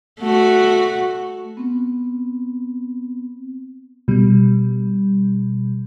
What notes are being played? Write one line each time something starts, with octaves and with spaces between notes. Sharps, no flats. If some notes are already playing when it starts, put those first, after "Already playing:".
A3 F#4
B3 C4
B2 G3